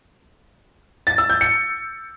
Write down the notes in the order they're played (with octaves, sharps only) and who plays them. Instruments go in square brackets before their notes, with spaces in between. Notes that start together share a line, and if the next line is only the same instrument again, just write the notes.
[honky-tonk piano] A6
E6
G6
C#7